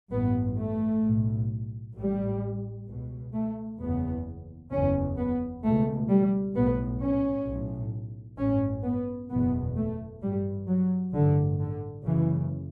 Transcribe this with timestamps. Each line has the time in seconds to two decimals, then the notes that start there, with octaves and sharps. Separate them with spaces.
0.12 A1 G2 B3
0.58 A3
1.04 B1 A2
1.95 A1 A2 G3
2.88 C#2 B2
3.34 A3
3.79 F#1 E2 C#3 B3
4.71 F#1 E2 C#3 C#4
5.17 B3
5.63 C#2 B2 A3
6.09 G3
6.55 B1 A2 B3
7.01 C#4
7.46 B1 A2
8.38 A1 G2 C#4
8.84 B3
9.30 F#1 E2 B2 B3
9.76 A3
10.22 A1 G2 G3
10.68 F#3
11.14 A1 G2 D3
11.60 D3
12.05 F#1 F#2 C#3 E3